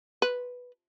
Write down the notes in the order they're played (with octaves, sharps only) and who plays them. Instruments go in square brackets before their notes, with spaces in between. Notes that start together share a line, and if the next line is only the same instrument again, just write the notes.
[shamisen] B4